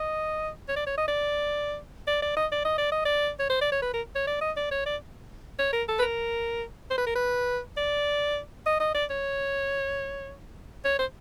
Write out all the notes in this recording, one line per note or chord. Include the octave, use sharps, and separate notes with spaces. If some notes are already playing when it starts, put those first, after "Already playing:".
Already playing: D#5
C#5
D5
C#5
D#5
D5
D5
D5
D#5
D5
D#5
D5
D#5
D5
C#5
C5
D5
C#5
B4
A#4
C#5
D5
D#5
D5
C#5
D5
C#5
A#4
A4
B4
A#4
C5
B4
A#4
B4
D5
D#5
D#5
D5
C#5
C#5
C5